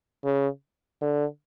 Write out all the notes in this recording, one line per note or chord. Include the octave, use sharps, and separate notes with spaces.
C#3
D3